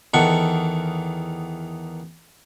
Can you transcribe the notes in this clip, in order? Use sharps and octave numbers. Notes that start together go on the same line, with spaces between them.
E2 D#3 A4 F#5 C#6